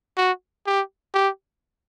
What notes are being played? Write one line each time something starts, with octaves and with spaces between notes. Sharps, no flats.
F#4
G4
G4